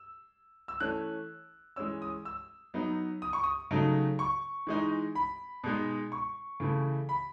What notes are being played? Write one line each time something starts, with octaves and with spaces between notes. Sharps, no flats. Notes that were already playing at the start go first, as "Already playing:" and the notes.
Already playing: E6
E6
E3 A3 C#4 F#6
E3 G#3 C#4 E6
D#6
E6
F#3 B3 D#4
D#6
C#6
D#6
C#3 F#3 A3 D#4
C#6
E3 G#3 D#4
B5
B2 G#3 D#4
C#6
C#3 E3 A3 E4
B5